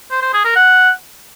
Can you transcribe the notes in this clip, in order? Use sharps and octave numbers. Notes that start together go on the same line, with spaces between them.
C5
C5
G#4
A#4
F#5